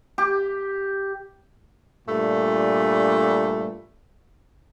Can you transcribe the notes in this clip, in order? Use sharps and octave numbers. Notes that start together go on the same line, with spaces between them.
G4
G2 A#2 A3